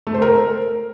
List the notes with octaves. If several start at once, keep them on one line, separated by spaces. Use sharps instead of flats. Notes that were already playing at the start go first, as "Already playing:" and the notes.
A3
C5
A#4